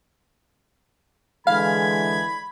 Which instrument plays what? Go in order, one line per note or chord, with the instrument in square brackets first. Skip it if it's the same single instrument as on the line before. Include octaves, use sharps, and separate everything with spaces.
[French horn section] D3 E3 G#3 [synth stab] F5 [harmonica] B5 [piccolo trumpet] G#6